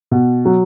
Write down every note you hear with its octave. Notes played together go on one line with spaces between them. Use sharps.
B2
F#3